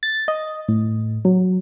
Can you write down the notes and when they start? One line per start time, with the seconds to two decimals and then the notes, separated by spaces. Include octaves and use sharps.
0.03 A6
0.28 D#5
0.69 A2
1.25 F#3